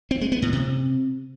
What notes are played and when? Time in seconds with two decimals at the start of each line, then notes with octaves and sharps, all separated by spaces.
0.11 C4
0.21 G#3
0.32 B3
0.42 A2
0.53 C3